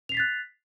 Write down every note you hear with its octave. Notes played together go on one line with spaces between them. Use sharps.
F#6 A6 B6 C7 F7